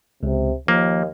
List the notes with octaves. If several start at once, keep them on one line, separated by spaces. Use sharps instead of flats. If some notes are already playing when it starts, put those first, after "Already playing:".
C#2 C3
D#2 F3 A#3